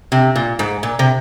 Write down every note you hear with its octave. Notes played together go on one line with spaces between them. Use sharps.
C3
A#2
G#2
A#2
C3